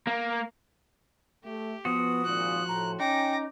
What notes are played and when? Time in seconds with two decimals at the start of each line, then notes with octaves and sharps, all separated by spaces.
0.07 A#3
1.44 A3 G4
1.85 F3 B3 F#4 D#6
2.25 G#1 A#2 F#6
2.68 A2 A#5
3.00 C#4 D#4 G5 D6 A#6